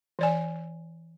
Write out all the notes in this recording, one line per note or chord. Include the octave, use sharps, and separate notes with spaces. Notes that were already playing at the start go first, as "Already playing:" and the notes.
E3 D5 G#5